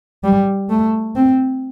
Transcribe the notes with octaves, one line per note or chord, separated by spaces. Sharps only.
G3
A3
C4